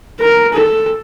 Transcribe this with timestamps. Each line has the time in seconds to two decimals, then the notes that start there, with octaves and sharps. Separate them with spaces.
0.20 A#4
0.53 A4